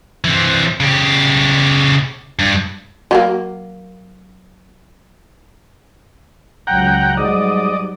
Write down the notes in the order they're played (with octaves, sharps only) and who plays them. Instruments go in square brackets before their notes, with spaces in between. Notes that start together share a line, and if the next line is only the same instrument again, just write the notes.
[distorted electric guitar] E3 C4
C#3 G4
G2
[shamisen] F#3 A3 A#3
[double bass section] C#2 F#3 [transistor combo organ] F#5 G5 A#5
[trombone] G#2 [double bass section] F#3 G3 [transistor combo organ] D5 D#5